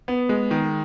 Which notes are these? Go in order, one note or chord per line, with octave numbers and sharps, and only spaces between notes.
B3
G#3
D#3